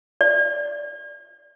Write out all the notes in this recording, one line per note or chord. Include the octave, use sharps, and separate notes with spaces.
D5